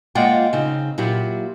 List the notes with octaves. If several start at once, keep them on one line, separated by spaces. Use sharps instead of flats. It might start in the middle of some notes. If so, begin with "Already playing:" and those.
G#3 A#3 F4 D5 F#5 G5
C#3 C4 D#4
A#2 F#3 E4 F4 G4